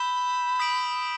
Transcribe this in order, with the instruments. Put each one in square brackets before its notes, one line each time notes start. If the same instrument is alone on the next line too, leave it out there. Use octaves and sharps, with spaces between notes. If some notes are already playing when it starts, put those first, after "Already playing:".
Already playing: [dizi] B5 [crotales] E6 G6 B6 E7 G7
[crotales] D#6 G6 B6 D7 F#7